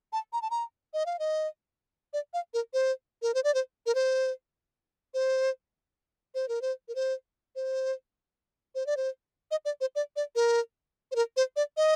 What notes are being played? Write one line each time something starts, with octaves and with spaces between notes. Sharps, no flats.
A5
A#5
A5
A#5
D#5
F5
D#5
D5
F5
A#4
C5
A#4
C5
D5
C5
A#4
C5
C5
C5
A#4
C5
A#4
C5
C5
C5
D5
C5
D#5
D5
C5
D5
D5
A#4
C5
A#4
C5
D5
D#5